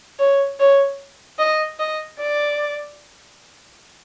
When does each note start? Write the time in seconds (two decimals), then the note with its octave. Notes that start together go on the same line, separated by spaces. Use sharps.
0.19 C#5
0.59 C#5
1.39 D#5
1.79 D#5
2.19 D5